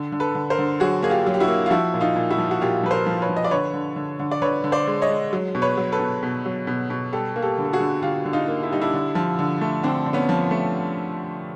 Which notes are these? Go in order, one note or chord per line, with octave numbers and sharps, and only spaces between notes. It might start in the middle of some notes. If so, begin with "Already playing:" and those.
Already playing: D3
D3
A4 B4
D3
A#4 C5
D3
F#3 F#4 G#4
A#3 G#4
F4 G4
F#3
G4
E4 F#4
A#3
F4
F3 E4 F#4
A#2
D#4 F4
A#2
E4 F#4
F3
F#4
A#2 F4 G4
F3 B4
A#4 C5
F3
B4 C#5
F3
D#5
D5
D3 B4 C#5
D3
D3
D3
D5
D3 B4 C#5
D3
C5 D5
G#3
C#5 D#5
G#3
F#3
B2
B4 C#5
F#3
A4 B4
B2
B2
F#3
B2
B2
G3 G4 A4
A#3
G4 A4
D3
A4
F#4 G#4
D3
D3 F4 G4
D3
D#4 F4
A#3
E4
G3 D#4
D4 E4
D3
F3
D3
A3
D3 C4 D4
D3
B3 C#4
F3
A3